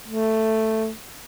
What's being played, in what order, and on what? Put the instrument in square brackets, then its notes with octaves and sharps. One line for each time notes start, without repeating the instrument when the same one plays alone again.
[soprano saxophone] A3